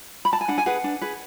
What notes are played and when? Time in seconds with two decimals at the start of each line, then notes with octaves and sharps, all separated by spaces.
0.25 B5
0.33 A5
0.41 G#5
0.48 D4 F#5
0.58 G#5
0.66 G#4 B4 F#5
0.84 D4
1.01 G#4 B4